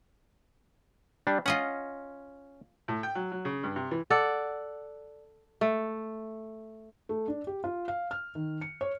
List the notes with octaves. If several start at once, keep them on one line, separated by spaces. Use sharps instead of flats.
G3 D4
C#4 F4 D#5 F#5
A2
G5
F#3
F#3
C#3
G2
C3
E3
A4 D5 F#5
A3
A3
D4
G4
F4
F5
F6
D#3
C#7
C#5